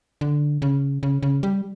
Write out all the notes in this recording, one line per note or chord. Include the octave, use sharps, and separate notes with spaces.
D3
C#3
C#3
C#3
G3